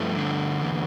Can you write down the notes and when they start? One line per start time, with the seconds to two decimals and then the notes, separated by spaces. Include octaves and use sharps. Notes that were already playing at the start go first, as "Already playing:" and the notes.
Already playing: G2 F3 A3
0.17 D3
0.61 E2